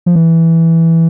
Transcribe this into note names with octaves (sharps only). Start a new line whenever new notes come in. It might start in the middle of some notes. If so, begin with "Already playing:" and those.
F3
E3